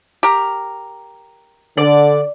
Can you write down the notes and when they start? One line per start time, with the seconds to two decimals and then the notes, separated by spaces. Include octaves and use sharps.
0.23 G4 A#4
1.78 D3 D5